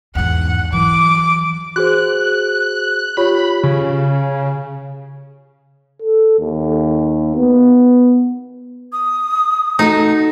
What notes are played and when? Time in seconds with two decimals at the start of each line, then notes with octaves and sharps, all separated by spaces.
0.15 E2 G#2 F#5
0.72 E3 F#3 D6
1.76 F#4 G#4 C5 F#6
3.17 F4 G4 C#5 B5
3.63 C#3
6.02 A4
6.40 D#2
7.36 B3
8.92 D#6
9.79 A3 D#4 F#4 A4